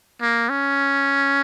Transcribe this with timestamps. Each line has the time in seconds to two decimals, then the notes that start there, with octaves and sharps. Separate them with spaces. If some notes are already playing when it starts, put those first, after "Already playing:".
0.22 A#3
0.50 C#4